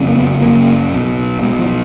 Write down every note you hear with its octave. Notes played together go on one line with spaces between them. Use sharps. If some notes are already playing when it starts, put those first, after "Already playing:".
Already playing: F#1 F2 C#3
A#3
B3
F#1 F#2 C#3 A#3
B1 B2
B1 B2 G#3
F3